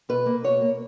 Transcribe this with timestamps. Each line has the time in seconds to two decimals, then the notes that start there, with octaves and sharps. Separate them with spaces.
0.09 B2 B4
0.26 A#3
0.44 B2 C#5
0.61 A#3